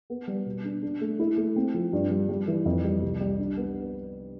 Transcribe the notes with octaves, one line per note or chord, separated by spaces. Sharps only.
B3
G3
B2
D4
D4
A3
E4
A3
C4
F3
G2
G3
G3
E3
F2
G3
C2
G3
D4
B3